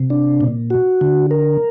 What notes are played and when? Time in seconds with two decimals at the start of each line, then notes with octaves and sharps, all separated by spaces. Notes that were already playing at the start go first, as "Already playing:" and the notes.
Already playing: C3
0.10 D4
0.41 A#2
0.70 F#4
1.01 D3
1.31 A#4